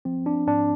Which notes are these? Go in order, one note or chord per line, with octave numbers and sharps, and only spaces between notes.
F3 C4
D4
G#2 D4